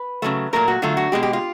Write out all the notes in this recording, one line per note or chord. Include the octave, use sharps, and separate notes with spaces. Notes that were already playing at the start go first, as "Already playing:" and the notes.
Already playing: B4
C#3 F#3 A3
A#2 F#3 A3 A#4
F#4
D3 F#3 A3 F4
F#4
B2 G#3 G4
G4
F4